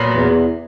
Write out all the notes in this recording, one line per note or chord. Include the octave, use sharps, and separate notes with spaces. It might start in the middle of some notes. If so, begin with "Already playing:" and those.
Already playing: A#2 F#3 B3
E2